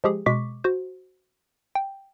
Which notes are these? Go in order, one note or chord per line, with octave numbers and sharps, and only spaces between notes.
F3 G#3 G4 G#4
B2 G#3 C#6 D6 B6
F#4 C5
G5